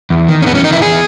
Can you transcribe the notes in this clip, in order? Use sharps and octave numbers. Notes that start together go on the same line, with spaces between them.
E2
D#3
C#4
E2 B3
C#4
D#3 D#4
E4
E2 G#4